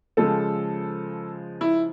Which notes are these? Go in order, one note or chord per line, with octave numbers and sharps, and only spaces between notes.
C#3 F3 G#3 A4
E4